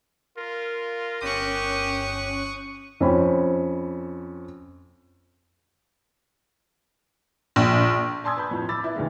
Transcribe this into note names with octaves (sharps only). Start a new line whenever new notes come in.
F4 A#4
G1 C#4 G4 C#6 D#6 F#6
F2 C4 C#4 B5
A#1
G#5 A5 C6 D#6 E6 G#6
B4 A5 B5 G6
F2 A2
B5 D6 E6 A6
E4 B4
D2 G2 D#3 E3 G#3 A#3